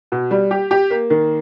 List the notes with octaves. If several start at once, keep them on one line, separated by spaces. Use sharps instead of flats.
B2
G3
G4
G4
A#3
D#3